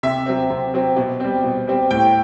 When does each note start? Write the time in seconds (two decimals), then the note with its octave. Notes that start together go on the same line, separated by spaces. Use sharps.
0.03 C3 E5
0.26 F#3 C4
0.50 C3
0.74 F#3 C4
0.96 B2
1.20 G3 C4
1.44 B2
1.67 G3 C4
1.91 A2 G5